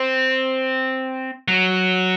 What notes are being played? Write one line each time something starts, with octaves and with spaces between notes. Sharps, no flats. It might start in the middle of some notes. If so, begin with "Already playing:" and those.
Already playing: C4
F#3